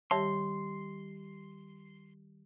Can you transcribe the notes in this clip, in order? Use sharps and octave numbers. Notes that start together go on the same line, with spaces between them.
D#3 G3 G4 C#5 E5 A5 C6